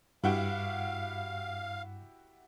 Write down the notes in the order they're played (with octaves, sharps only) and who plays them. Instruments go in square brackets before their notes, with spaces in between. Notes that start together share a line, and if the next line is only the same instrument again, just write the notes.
[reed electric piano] G2 [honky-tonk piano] E4 F#4 G4 [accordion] F5